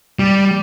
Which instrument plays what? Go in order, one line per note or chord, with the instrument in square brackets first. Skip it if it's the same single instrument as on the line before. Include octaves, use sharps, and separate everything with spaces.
[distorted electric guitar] G3